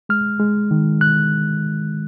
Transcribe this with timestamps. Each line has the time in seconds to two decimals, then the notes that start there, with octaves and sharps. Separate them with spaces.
0.09 G#3 F6
0.40 G#3
0.71 D#3
1.01 F#6